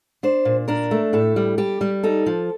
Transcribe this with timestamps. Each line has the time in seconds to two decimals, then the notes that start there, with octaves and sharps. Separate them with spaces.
0.23 D4 C5
0.45 A#2
0.68 D4 A#4
0.91 A3
1.13 A2 A4
1.36 G3
1.58 G3 G4
1.81 G3
2.03 D#4 A4
2.26 F3